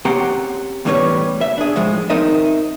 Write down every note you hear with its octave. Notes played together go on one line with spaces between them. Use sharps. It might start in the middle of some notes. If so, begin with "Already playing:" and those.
C4 C#4 G4 F#5 A#5 C6
E2 A2 G3 C#4 B4 C#5
E5
D4 G#4
A2 F3 G#3
C4 D#4 A#4 D#5 E5